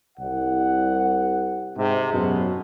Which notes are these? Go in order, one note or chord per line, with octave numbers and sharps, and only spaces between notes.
C2 F#5
G#2 C3
F#2 B2